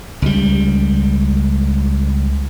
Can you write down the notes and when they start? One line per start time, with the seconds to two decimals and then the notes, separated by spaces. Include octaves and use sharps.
0.22 C#2 G3